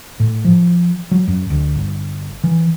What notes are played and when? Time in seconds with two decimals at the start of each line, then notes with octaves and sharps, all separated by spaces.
0.20 A2
0.45 F3
1.11 F#3
1.27 F#2
1.50 D2
1.75 G1
2.44 E3